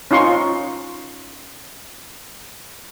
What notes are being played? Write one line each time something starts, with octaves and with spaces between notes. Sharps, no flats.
C#4 D#4 F4 C6 C#6